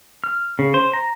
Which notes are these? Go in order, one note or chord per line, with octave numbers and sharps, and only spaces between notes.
F6
C#3
C5
A#5